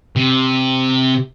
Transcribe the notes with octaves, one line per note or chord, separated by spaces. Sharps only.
C3